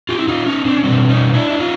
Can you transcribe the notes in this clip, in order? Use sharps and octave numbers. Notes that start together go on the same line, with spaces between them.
F4 G4
E4
D#4 F4
C#4 D#4
C4 D4
C#4
B2 G3 C4 D4
C#4 D#4
D4 E4
E4
D#4 F4